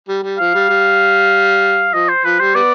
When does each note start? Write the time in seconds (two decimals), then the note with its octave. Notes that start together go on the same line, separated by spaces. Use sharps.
0.08 G3
0.23 G3
0.39 F3 F5
0.54 G3
0.69 G3
1.93 F3 D#5
2.09 C5
2.24 F3 B4
2.39 G3 C5
2.55 G3 B3 D5